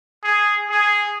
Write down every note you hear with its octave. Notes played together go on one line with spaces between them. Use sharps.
G#4
G#4